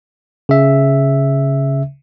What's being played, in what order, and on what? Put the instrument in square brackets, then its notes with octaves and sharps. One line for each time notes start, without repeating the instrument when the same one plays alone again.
[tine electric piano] C#3 E5